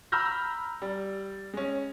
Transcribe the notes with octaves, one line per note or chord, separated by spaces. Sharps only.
A#5 B5 E6 F6 G6 A#6
G3
G#3 C#4